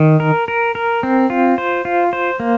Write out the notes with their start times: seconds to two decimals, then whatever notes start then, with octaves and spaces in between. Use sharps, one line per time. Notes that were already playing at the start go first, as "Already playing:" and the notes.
Already playing: D#3
0.20 A#4
0.48 A#4
0.75 A#4
1.03 C4
1.30 F4
1.58 C5
1.85 F4
2.13 C5
2.40 A#3